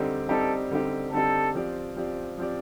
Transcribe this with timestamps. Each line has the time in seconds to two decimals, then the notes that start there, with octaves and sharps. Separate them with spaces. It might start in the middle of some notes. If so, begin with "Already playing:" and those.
Already playing: D3 G3 C4 D#4 G4
0.28 D3 G3 C4 D#4 G4 A4
0.71 D3 G3 C4 D#4 G4
1.12 D3 G3 C4 D#4 G4 A4
1.55 F3 C4 G4 D5
1.96 F3 C4 G4 D5
2.38 F3 C4 G4 D5